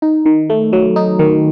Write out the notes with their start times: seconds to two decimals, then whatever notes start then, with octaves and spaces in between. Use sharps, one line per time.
0.02 D#4
0.26 D#3
0.50 A3
0.73 F#3
0.96 D#4
1.19 D#3